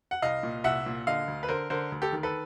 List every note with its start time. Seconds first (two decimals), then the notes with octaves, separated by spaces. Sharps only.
0.11 F#5
0.22 C2 D#5 F5
0.43 A#2
0.64 C2 E5 F#5
0.86 A#2
1.07 D3 D#5 F5
1.28 D2
1.43 B4
1.48 D3 A#4 C5
1.70 D3 A#4 C5
1.92 D2
2.02 G4 A4
2.13 D#3
2.23 A4 B4